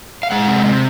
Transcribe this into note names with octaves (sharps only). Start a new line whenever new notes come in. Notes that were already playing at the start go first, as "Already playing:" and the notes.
F5
G#3 F#5
C3
C3